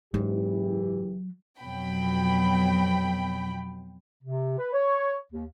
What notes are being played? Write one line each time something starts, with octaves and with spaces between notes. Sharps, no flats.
F#1 G#2 E3 F#3 G4
F2 B2 F#3 G5 B5
C3
B4
C#5
D#2